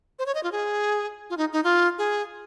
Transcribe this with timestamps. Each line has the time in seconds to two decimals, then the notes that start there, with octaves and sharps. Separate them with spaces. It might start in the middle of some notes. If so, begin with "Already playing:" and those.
0.19 C5
0.26 C#5
0.35 D#5
0.43 F4
0.52 G#4
1.30 F4
1.37 D#4
1.53 D#4
1.64 F4
1.98 G#4